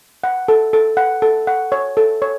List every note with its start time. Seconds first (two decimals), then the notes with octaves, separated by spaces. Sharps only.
0.24 F#5
0.48 A4
0.73 A4
0.97 F#5
1.22 A4
1.47 F#5
1.72 C#5
1.97 A4
2.22 C#5